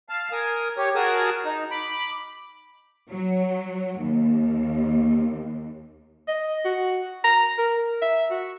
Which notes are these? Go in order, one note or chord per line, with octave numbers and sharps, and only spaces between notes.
F5 A5
A#4 G#5 D#6
G4 C#5
F#4 G#4 A#4 A5 D#6
D#4
B5 D6
F#3
D#2
D#5
F#4
A#5
A#4
E5
F#4